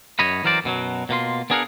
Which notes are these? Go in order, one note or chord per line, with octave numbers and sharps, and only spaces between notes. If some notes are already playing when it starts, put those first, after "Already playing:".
F#2 C#5 D#5 B5
E3 F#3 A#4 C5 D5
F#2 B2 E3 F#3
B2 A#3 F4 C6
B3 D4 G#4 A#4 F5 F#5